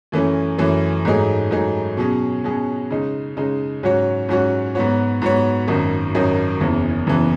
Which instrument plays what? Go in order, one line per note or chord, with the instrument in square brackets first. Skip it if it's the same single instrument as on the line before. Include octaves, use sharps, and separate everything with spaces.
[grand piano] F#2 E3 A3 C#4
F#2 E3 A3 C#4
G#2 F#3 A3 D#4 G#4
G#2 F#3 A3 D#4 G#4
B2 F#3 C#4 G#4
B2 F#3 C#4 G#4
C#3 G#3 D#4
C#3 G#3 D#4
G#2 F#3 C#4 F#4 C#5
G#2 F#3 C#4 F#4 C#5
G#2 F#3 B3 F#4 C#5
G#2 F#3 B3 F#4 C#5
G#1 F#2 D#3 F#3
G#1 F#2 D#3 F#3
F#1 E2 C#3 E3
F#1 E2 C#3 E3